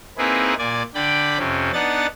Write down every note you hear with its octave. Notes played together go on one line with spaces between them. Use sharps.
A#3 C4 D#4 E4 G#4 B4
A#2 D5 G#5
D3 D5 G5 B5
F2 C3 C4 C#4
B3 D4 D#4 F#5 A6